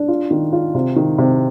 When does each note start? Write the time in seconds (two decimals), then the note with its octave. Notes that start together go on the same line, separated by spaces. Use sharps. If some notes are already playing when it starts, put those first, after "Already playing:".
Already playing: D4
0.08 F4
0.31 D#3
0.53 F4
0.75 C3
0.96 D#3
1.18 C3